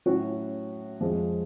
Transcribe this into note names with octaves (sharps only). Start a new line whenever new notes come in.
A2 F#3 C#4 F#4
F2 F3 G#3